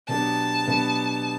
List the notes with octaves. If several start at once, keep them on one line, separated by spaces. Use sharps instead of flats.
B2 F#3 B3 D4 G4 A5
B2 F#3 B3 D4 G4